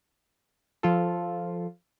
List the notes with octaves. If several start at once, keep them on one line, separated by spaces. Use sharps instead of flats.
F3 F4 A4